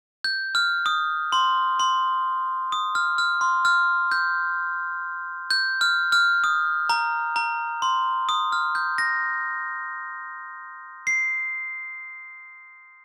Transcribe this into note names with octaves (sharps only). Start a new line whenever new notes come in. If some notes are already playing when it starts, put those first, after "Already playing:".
G6
F6
D#6
C6
C6
D#6
F6
F6
C6
F6
G6
G6
F6
F6
D#6
A#5
A#5
C6
D#6
F6
G6
A#6
C7